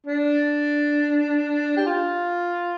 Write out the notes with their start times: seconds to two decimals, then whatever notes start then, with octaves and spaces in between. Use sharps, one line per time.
0.06 D4
1.77 G4
1.86 F4